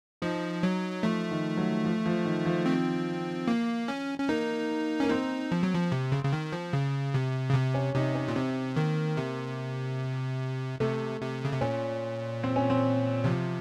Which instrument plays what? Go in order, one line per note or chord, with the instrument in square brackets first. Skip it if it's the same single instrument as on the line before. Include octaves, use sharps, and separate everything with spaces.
[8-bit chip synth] F3 [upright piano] D#4
[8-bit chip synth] F#3
[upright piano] F3 [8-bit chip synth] A3
[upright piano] D#3
F#3
F3
F3
D#3
F3
[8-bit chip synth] C4
A#3
C#4
C#4
[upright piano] A#3 [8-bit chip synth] D#4
[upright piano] A#3 [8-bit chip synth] C#4
[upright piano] C4 [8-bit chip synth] D#4
[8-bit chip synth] F3
F#3
F3
C3
C#3
C#3
D#3
F3
C#3
C3
C#3
C3
[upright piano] C#4
[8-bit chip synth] C3 [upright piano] D#4
[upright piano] C#4
[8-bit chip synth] A#2
[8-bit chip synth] C3 [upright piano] C4
[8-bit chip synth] D#3 [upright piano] A#3
[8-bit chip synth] C3
[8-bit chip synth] C3 [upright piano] A3
[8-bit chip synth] C3
C#3
C3
[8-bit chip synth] A#2 [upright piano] C#4
[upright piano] C4
C#4
C4
[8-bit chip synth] C3 [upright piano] F3